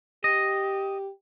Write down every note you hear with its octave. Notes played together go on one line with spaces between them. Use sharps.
G4 D#5